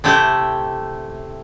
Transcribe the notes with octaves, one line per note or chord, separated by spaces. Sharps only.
C3 A3 E4 G4